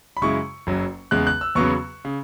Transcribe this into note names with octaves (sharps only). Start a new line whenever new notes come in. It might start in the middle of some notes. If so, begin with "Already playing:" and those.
B5
F#2 C#3 G#3 E4 C#6
F#1 F#2 F#3
E2 C#3 G#3 F#6
F#6
E6
E2 C#3 F#3 B3 C#6
C#3